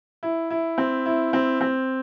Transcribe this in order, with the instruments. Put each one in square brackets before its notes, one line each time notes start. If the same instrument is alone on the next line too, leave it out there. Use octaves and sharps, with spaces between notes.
[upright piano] E4
E4
C4
E4
C4
C4